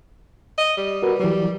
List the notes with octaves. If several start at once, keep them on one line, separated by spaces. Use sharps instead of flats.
D#5
G3
F#4 A#4 B4
E3 F#3 G3